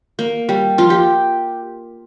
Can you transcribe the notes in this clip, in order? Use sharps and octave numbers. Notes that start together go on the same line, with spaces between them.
A#3
G3
F3 F4
G4